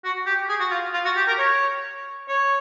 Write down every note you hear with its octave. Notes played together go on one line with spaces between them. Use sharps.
F#4
G4
G#4
F#4
F4
F4
F#4
G4
A#4
C#5
C#5